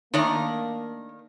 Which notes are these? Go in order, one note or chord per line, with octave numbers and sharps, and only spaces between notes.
D#3 A3 A#3 D4 A#4